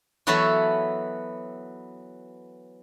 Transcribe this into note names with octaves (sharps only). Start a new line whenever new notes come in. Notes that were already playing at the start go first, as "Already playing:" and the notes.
E3 F#3 B3 A4 C#5 E5